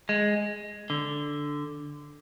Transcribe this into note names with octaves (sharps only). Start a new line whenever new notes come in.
G#3
D3